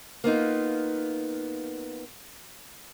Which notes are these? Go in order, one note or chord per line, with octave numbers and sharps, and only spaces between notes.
A#3 B3 D#4 F4